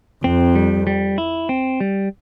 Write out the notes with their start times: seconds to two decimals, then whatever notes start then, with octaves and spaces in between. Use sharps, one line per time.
0.24 F2 C4
0.55 G3
0.87 G3
1.18 E4
1.49 C4
1.80 G3